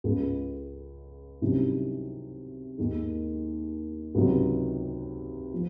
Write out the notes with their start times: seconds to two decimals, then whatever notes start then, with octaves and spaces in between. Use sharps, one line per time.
0.04 C#2 C#3 G#3
1.41 C2 C3 D#3 F#3 C#4
2.78 D#2 D#3 G#3
4.15 C#2 C3 D#3 F#3
5.54 F3